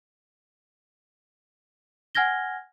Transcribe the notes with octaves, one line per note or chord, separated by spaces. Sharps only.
F#5 G#5 F6 G#6 A#6 G7